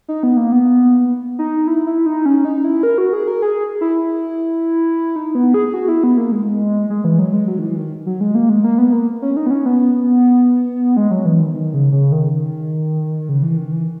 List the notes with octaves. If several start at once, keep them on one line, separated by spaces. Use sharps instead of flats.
D#4
B3
A#3
B3
D#4
E4
E4
D#4
C#4
D#4
E4
A#4
F#4
G#4
A#4
G#4
E4
D#4
B3
G#4
F#4
E4
B3
A#3
G#3
G#3
E3
F#3
G#3
F#3
D#3
E3
D#3
F#3
G#3
A#3
G#3
A#3
B3
A#3
C#4
D#4
B3
C#4
B3
G#3
F#3
E3
D#3
D#3
C#3
C#3
D#3
C#3
E3
D#3
E3